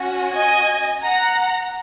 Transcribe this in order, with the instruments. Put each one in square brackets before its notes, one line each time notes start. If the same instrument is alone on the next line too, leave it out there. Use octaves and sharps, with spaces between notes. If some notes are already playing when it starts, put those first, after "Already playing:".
Already playing: [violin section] C#4 F#4
D#5 G#5
F#5 A#5